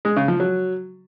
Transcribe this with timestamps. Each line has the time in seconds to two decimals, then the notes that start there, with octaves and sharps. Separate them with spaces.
0.05 G#3
0.16 C#3
0.28 F3
0.40 F#3